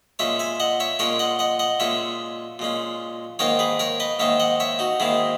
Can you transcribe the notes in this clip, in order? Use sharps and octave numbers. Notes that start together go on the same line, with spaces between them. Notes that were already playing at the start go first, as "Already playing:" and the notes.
A#2 G#3 C#4 C#5 E5
E5 G#5
D#5 F#5
C#5 E5
A#2 G#3 C#4 A#4 C#5
D#5 F#5
D#5 F#5
D#5 F#5
A#2 G#3 C#4 C#5 E5
A#2 G#3 C#4
G#2 D#3 A#3 D#4 A#4 C#5
G#4 B4
A#4 C#5
B4 D#5
G#2 D#3 A#3 D#4 C#5 E5
D#5 F#5
C#5 E5
D#4 F#4
G#2 D#3 A#3 D#4 E4 G#4